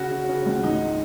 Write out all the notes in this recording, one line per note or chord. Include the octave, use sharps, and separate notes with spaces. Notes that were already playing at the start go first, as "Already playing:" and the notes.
Already playing: C#3 F#4
C#3
C#3
C#2
G#2 D#4